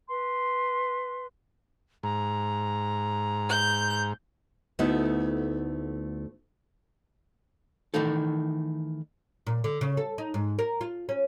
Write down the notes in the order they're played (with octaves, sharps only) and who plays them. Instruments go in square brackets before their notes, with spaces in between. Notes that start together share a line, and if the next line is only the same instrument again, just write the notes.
[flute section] B4 C6
[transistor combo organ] G#2 [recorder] A#5
[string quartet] G6
[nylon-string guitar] D2 A3 B3 D#4 E4
[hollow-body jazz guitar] D#3 E3 A3 D#4 A4
[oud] A#2
D3
C#3
A4
D#4
G#2
A#4
F4
C#4